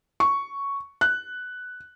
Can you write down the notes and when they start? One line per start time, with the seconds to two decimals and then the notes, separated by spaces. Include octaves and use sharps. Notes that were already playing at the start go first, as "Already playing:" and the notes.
0.20 C#6
1.01 F#6